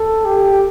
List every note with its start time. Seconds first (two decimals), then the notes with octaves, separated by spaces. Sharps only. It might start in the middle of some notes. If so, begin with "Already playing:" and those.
Already playing: A4
0.25 G4